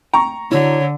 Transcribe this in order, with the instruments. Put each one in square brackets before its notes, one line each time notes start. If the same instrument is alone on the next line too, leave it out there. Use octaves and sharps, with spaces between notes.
[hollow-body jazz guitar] G5 [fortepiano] A#5 C#6
[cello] D3 [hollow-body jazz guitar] E4 F#4 [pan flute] C#5